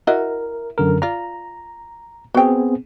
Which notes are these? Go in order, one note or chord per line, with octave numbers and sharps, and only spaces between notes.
E4 F#4 A#4 D#5
F#2 D3 A#4
F4 D5 A#5
B3 C4 F#4 G#4 G5